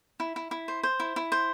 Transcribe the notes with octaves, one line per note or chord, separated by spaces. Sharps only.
E4
E4
E4
C5
C5
E4
E4
C5